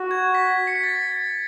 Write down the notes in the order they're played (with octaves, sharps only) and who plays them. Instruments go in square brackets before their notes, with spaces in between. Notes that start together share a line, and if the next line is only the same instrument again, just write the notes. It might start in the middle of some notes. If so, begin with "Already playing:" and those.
Already playing: [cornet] F#4
[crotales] G#6
B6
C#7
B6
A6